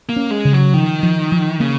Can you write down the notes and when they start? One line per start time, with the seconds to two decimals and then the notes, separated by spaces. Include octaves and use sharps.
0.09 A#3
0.16 C#4
0.31 G#3
0.45 C#3
0.53 F#3
0.74 D#3 F3
1.03 F3
1.32 F3
1.60 C#3 A#3